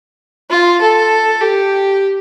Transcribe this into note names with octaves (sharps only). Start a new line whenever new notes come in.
F4
A4
G4